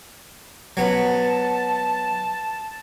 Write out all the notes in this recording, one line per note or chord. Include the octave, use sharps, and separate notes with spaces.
F#3 B3 A5